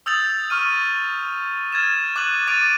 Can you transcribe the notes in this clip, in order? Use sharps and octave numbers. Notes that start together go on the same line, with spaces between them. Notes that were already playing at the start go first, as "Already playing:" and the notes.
D#6 E6 G6 A6 F7 F#7
C#6 F6 D#7
F6 G#6 A6 E7
D6 F#6 D#7 F#7
D6 A6 D7 D#7 F7